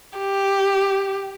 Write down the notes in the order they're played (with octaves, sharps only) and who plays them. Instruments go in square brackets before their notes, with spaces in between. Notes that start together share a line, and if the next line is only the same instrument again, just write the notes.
[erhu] G4